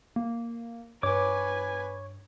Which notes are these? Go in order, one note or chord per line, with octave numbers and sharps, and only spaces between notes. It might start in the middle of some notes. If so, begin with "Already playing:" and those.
A#3
G2 B4 C#5 G#5 D6